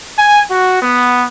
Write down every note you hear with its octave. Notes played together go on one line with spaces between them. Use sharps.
G#5
F#4
B3